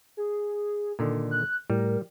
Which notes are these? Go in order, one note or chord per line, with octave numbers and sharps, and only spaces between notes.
G#4
A#2 D3 D#3
F#6
A2 G3 A#4